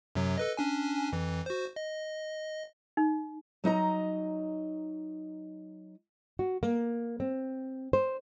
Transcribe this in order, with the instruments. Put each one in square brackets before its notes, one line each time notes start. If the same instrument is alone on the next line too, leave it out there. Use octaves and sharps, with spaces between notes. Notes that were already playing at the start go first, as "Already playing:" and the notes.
[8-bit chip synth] F#2 C3 F#3
A4 B4 D#5
C#4 D4 G#5
F2 E3
F#4 C5
D#5
[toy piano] D#4
[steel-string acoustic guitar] F#3 D#4 D#5 A#5
[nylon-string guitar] F#4
A#3
C4
C5